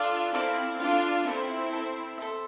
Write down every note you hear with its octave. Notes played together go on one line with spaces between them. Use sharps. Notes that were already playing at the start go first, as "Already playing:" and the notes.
Already playing: D4 F4 A4 D5 F5
C4 E4 A4 D5 F5
D4 F4 A4 D5 F5
C4 E4 A4 C5 E5
A4 C5 E5
A4 C5 E5